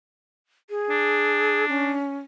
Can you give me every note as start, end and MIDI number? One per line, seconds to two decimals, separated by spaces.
0.70 1.65 68
0.90 1.95 62
1.69 2.18 61